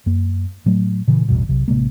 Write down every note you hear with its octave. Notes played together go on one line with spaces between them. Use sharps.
F#2 A#3
A2 F#3 A3
A#2 C#3 E3
A1 E2 G2 B2
B1 C3
A1 C3 G#3 A#3